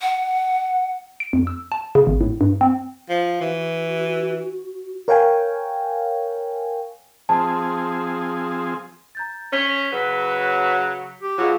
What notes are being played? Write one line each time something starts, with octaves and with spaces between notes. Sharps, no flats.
F#5
D7
F2
E6
A5
C#3
G#1
A2
G2
C4
F3
E3 F#4
A#4 C#5 F5 G5 G#5
F3 C4 G#4 A5
A#5 G6 A6
C#4 G6 B6 G7
C#3 F#3 B4
G4
B2 F#3 F4 G#4 F5